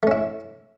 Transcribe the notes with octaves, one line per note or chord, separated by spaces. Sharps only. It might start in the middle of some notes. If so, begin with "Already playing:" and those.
A3 C#4 E4